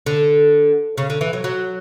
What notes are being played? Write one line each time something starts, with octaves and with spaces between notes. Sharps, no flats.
D3
C#3
D3
E3
F#3
F#3